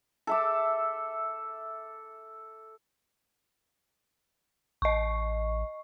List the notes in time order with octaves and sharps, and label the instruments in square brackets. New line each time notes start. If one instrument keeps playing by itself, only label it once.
[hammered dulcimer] A4 E5 D6
[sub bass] A1 [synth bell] D#5 C#6